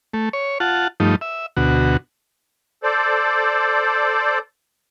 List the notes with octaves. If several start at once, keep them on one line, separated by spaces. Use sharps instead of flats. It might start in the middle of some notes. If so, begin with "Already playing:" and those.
A3
C#5
F4 F#5 A5
G2 F3 A3 D#4
E5
D2 B2 F#4
A4 C5 D5